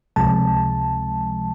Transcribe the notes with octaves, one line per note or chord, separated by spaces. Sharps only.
C#2 C3 F3 G#3 A5